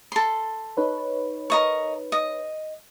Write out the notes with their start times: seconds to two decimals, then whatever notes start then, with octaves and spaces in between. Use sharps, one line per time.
0.12 A4 C6
0.77 D#4 B4 C#5
1.50 A#4 D#5 C#6
2.12 D#5